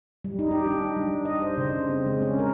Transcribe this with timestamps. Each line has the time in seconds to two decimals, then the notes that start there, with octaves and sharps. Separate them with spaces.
0.24 G3
0.39 D#4
0.51 G4
0.67 D4
0.96 G3
1.25 D#5
1.42 C5
1.58 C#3
1.90 C4
2.06 G#3
2.22 C#4
2.39 A#4